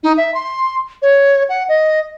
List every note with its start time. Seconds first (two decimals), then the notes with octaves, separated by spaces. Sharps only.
0.03 D#4
0.17 E5
0.34 C6
1.02 C#5
1.49 F#5
1.69 D#5